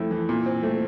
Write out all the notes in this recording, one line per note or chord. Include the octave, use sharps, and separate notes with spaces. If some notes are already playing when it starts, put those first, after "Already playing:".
Already playing: F2 A3 E4
E3
A#2
C4
A3